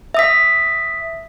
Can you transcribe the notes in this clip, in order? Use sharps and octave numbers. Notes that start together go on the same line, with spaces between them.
E5 D#6 B6